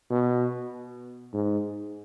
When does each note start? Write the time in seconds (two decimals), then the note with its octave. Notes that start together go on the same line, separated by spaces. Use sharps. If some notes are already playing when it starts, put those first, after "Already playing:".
0.11 B2
1.34 G#2